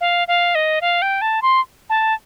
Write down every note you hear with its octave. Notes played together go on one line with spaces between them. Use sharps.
F5
F5
D#5
F5
G5
A5
C6
A5